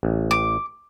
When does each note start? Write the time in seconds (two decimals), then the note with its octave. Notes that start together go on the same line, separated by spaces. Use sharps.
0.03 A1
0.31 D6